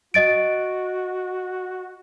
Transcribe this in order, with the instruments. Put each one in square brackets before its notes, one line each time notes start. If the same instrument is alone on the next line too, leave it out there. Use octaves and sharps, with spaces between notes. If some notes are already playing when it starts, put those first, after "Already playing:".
[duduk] F#4 [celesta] D#5 A6 D7